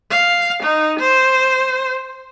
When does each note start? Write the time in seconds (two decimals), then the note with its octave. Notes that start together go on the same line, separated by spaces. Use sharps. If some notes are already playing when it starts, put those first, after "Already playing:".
0.11 F5
0.63 D#4
0.99 C5